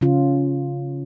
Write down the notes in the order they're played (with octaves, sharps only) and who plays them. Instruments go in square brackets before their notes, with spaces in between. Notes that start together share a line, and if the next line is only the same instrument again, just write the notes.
[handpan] C#3 C#4 F4